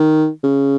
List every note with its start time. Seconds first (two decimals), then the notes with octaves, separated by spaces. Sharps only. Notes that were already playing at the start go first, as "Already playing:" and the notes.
Already playing: D#3
0.43 C#3